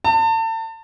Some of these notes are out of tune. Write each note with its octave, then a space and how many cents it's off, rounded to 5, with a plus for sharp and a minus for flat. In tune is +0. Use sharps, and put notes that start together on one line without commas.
A5 +35